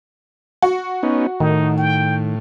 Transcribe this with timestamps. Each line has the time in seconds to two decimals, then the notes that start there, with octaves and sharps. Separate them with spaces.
0.62 F#4
1.03 B3 C#4 D#4
1.40 A2 D#3 D#4
1.78 G5